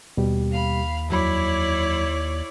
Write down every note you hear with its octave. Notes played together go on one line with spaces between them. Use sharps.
D#2 B2 G3 G4
F5 B5
F2 F#3 E4 C#5 D5 B5